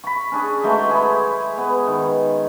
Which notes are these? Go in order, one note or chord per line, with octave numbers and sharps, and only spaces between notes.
B5 C#6
C#4 D4 G#4
F#3 G#3 A3 B4
E4 G#4 C#5 B5
B3
D#3